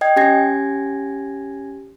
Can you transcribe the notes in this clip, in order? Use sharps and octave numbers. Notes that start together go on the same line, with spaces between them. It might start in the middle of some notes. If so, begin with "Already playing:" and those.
D#5 G5 G#6
C#4 G4 G#5 G#6 A#6